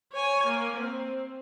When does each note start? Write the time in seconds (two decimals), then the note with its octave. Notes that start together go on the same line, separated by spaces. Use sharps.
0.13 C#5 G#5
0.46 A#3
0.77 C4